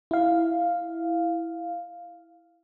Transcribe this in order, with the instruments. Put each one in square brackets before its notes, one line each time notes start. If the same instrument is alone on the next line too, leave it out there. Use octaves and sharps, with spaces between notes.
[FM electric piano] E4 F5